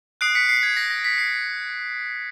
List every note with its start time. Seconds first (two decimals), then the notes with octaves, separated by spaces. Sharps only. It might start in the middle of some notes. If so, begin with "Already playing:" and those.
0.21 D#6 F#6 C7 D7
0.35 B6 C#7
0.49 C7
0.63 G#6
0.77 A#6
0.90 A#6
1.04 B6
1.18 C7